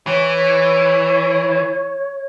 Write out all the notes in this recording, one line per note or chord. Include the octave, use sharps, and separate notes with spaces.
E3 C#5